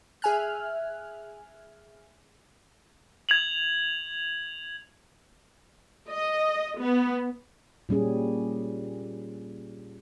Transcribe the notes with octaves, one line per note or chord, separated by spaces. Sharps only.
G#4 E5 G#5 F6 F#6
G#6 F7 F#7
D#5
B3
A#2 G3 C#4 G#4